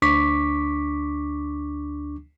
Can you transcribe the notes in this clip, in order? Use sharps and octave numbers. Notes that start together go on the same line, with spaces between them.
D2 D4 C#6 D6 B6